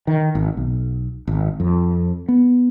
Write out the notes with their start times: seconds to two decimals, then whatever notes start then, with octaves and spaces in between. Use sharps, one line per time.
0.07 D#3
0.35 G#1
0.57 B1
1.27 G#1
1.60 F2
2.28 B3